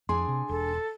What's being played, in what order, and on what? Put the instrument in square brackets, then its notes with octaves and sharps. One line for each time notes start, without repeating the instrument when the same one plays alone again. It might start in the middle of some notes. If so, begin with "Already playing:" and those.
[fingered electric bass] F2 [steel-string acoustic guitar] D4 G#4 G#5 [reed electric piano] C6
[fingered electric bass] C3
[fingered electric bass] E1 [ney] A4